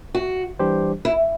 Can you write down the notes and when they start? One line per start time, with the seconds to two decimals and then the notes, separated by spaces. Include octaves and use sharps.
0.15 F#4
0.59 E3 G3 D4 G4 C5
1.05 E4